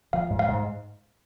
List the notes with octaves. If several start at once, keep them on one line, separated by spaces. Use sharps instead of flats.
F3 F5
G#2
F5
G#2